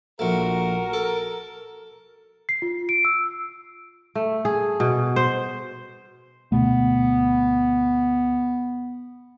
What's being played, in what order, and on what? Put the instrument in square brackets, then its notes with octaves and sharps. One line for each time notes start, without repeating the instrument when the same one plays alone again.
[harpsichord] A#1 A3 [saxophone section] F#4 A#4
[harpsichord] A4
[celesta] C7
F4
D7
E6
[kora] A3
G#4
B2
C5
[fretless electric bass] D2 B2 A3 [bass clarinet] B3